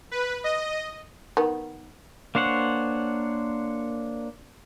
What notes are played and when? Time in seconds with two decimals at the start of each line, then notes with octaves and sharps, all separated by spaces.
0.11 B4
0.44 D#5
1.37 D#3 B3
2.35 A#3 D4 C5 C#5 F#5